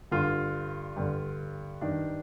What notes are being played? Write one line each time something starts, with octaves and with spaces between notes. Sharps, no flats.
G2 D3 F4
G2 D3
G2 D#3 D4